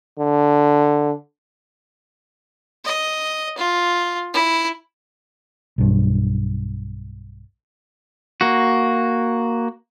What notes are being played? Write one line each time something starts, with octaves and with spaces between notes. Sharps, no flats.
D3
D#5
F4
E4
B1 G2
A#3 F#4